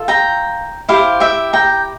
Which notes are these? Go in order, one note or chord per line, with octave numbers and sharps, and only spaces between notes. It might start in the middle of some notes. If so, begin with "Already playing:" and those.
Already playing: F4 A4
G5 A#5
E4 G4 C5 F5
E5 G5
G5 A#5